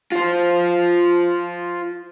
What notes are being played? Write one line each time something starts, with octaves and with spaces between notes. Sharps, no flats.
F4 C5